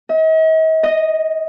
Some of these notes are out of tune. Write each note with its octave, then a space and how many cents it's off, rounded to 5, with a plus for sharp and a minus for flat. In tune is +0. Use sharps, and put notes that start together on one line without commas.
D#5 +45
D#5 -5